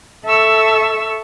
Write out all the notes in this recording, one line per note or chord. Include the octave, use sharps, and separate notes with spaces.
A4 E5 A5 C#6 E6